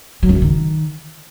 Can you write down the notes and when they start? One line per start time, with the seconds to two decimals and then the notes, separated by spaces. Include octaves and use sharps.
0.23 F#3
0.29 F#2
0.35 C#3
0.42 D#3